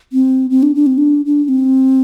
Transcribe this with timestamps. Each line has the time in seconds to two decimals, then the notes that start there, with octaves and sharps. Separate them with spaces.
0.12 C4
0.50 C4
0.63 D4
0.75 D4
0.87 C4
0.98 D4
1.26 D4
1.44 D4
1.49 C4